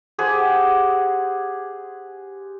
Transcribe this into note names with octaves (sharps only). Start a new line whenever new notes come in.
G4 G#4 C5 F#5